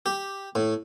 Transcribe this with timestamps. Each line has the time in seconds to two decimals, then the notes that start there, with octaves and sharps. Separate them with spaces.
0.06 G4
0.55 A2